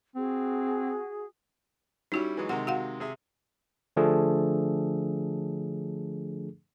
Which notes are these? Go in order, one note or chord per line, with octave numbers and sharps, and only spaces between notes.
C4 F#4 G#4
G3 C#4 D#4 E4 F#4 G4
E3 F#3 G#3
C3 D#3 G#3 F#5
F#4 F5 F#5
C3 G#4 E5
D3 F3 A3 D4 G#4 A4